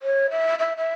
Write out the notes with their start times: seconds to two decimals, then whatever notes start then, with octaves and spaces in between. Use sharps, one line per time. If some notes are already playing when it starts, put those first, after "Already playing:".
0.03 C#5
0.31 E5
0.59 E5
0.77 E5